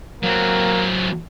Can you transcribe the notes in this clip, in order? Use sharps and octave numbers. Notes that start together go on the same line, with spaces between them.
F#3 A#3 C4